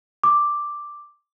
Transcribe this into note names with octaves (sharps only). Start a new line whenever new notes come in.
D6